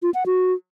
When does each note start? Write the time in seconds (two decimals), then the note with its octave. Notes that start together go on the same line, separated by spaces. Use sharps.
0.03 F4
0.14 F#5
0.26 F#4